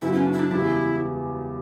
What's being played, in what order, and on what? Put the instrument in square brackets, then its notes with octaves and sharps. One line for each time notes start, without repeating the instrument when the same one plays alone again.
[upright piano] F#2 C#3 E3 B3 F#4 [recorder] E4
[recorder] C#4
D4
E4
D4
[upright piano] E1 E2 C#3 E3 G3 [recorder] E4